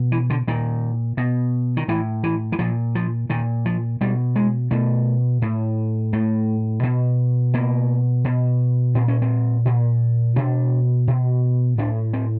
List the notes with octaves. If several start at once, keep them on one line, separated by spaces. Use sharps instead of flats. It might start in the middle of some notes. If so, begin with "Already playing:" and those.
Already playing: B2
E3
D3
A#2 D#3
B2
D#3
A2 E3
E3
E3
A#2 F3
F3
A#2 D#3
F3
B2 G3
G#3
B2 A3
A2
A2 A3
B2
B2 A#3
B2
A#2 C4
C#4
C4
A#2
B2 D4
B2
A2 D4
C4